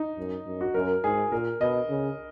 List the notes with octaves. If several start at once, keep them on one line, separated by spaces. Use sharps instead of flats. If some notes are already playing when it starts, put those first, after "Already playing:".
Already playing: D#4
F#2
F#2
F#4
F#2 A#4
G#2 G#4
A#2 A#4
B2 D#5
C#3